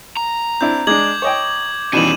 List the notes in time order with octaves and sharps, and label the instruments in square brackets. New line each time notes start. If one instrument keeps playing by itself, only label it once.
[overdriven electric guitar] A#5
[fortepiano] C4 D4 E4 [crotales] G6
[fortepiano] G#3 D4 [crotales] D6 G#6 F#7
[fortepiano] C#5 D#5 G5
[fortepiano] B2 D#3 E3 [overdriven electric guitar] G3 C#4 [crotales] D#7 E7 F#7